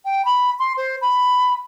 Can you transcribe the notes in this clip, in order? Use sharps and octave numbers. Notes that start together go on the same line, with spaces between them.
G5
B5
C6
C5
B5